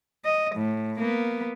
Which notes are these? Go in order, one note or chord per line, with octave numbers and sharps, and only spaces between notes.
D#5
A2
A#3 B3